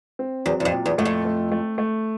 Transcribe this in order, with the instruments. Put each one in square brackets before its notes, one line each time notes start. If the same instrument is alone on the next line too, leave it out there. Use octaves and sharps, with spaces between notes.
[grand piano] C4
[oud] E2 [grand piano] F#3
[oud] E2
F2
[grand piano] A#2
[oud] E2
[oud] F#2 [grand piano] A3
[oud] F2
[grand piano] A3
A3
A3